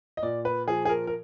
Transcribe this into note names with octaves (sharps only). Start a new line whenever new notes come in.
D#5
A#2 D5
B4
F3 G#4
G#4
A#4
A#4